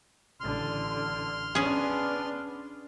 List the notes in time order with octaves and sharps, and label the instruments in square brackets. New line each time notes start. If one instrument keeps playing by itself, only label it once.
[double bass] A1 D3 [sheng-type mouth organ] C6 F6
[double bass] B3 D4 [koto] C#4 G#4